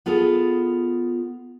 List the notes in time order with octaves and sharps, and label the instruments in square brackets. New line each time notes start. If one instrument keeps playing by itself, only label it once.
[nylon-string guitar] B3 F4 G#4 A4